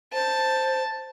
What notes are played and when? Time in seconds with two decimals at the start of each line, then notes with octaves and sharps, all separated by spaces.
0.13 C5 A5